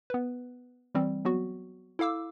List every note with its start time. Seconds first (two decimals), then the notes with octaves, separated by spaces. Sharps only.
0.10 B3 B4
0.95 E3 G3 C4
1.25 F#3 B3 F#4
1.99 E4 A4 F5 D6 E6